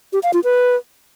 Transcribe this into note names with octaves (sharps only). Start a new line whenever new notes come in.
G4
F5
F4
B4